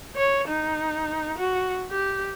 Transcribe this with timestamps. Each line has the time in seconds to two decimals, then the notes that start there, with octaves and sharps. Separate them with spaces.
0.16 C#5
0.48 D#4
1.39 F#4
1.91 G4